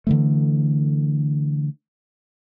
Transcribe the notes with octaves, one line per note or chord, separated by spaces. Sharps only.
D3 E3 A3